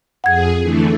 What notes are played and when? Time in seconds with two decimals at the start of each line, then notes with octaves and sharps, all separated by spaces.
0.24 F2 G#4 F#5 G#6
0.61 D3 E3 A3